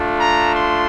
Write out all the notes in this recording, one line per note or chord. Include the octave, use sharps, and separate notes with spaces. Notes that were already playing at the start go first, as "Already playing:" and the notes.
Already playing: A3 D4 F4
A#5
C6